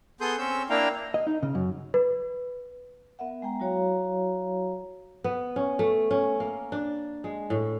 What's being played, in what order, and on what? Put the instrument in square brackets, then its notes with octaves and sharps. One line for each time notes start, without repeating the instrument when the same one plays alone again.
[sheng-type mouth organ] B3 G#4 A4 C6 D#6 G6
C4 C#4 C#5 E6 G6
A#3 D4 E4 F5 G5 A#5
[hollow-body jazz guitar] D#5
D#4
C#3
F#2
[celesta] B4
[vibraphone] B3 A#4 E5 F#5
G#3 B3 G5 A#5
F#3 E4 F#4 C#5 F5 A#5
[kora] B3
C#4
A3
C#4
A#3
D4
G#3
A2